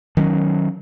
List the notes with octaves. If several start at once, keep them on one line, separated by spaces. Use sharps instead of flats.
D#3 F#3 C#4